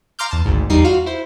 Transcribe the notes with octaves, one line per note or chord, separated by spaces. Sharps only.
F5 A#5 C6 D6 F6 G6
E2 A5
G#1 D2 G#2
E2 G3 D#4 C7
F4 F#4 F5
E4 C5